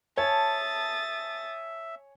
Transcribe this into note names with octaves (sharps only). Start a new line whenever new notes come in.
C#5 E5 G#5 A5 D#6 A6